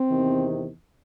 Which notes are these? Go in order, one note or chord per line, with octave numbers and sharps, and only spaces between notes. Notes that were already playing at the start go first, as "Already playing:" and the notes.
Already playing: C4
E2 C3 D#3